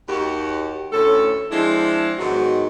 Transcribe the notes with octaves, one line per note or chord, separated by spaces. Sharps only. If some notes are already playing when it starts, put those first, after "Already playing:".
D#2 F#4 G4
D2 A2 C#4 A4
F3 G#3 C4 D4 E4
G#2 D#3 F#3 B3 D#4 F#4